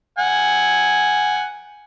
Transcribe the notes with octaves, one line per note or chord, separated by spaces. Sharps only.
F#5 G#5